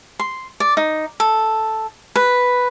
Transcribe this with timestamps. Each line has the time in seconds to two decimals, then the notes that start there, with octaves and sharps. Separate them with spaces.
0.19 C6
0.60 D5
0.77 D#4
1.20 A4
2.16 B4